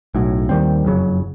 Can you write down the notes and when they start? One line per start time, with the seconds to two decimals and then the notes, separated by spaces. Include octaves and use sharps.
0.14 B1 A2 F#3
0.49 D#2 D#3 G3 C4
0.85 F#1 F2 C#3 F#3